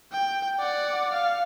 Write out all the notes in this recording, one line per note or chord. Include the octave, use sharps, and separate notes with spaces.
G5
D5 F#5
F5